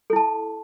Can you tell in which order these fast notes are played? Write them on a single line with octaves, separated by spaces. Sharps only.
A4 E4 A5